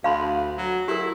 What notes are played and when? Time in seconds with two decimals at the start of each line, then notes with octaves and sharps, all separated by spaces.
0.04 D2 F5 B5 C6
0.58 F#3
0.88 E4 G4 A#4